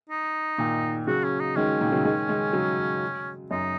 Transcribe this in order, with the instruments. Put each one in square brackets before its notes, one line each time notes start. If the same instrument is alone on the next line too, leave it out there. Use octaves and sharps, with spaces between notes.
[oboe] D#4
[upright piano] A#2 D#3
[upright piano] C#3 F#3 [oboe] F#4
[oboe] C#4
D#4
[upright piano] D#3 G#3 [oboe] C#4
[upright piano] A#2 D#3
C#3 F#3
D#3 G#3
D#3 G#3
C#3 F#3
[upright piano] F#2 [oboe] D#4